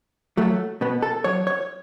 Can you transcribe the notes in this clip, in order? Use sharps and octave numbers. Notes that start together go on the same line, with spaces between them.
F#3 A3
B2 B3
A4
F#3 C#5
C#5